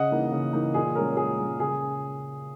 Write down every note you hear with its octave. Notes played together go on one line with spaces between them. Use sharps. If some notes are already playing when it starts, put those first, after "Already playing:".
Already playing: C#3 D#5 F#5
E3 A#3 D#4
C#3
E3 A#3 D#4
A#2 G#4
G#3 C#4 A#4
A#2 G#4
G#3 C#4
C#3 G#4